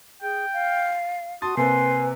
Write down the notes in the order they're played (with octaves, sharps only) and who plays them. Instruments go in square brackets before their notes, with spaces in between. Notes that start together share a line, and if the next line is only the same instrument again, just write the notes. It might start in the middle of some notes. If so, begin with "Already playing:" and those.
[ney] G#4 [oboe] G5
[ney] F5
[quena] F#4 [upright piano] A5 C6 A6 [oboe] D#6
[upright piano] C3 A#3 C4 [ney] B4 [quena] G#5 [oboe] C6